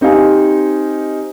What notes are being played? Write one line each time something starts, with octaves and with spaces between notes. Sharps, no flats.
C4 D#4 G4 F5 G#5